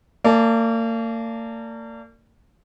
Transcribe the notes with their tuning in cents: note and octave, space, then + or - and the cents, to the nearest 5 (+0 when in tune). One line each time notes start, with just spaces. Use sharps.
A#3 -40 D5 -10 A5 -30